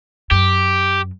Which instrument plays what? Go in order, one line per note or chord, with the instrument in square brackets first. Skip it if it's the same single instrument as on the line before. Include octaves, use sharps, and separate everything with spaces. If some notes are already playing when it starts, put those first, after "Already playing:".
[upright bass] F#2 [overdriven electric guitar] G4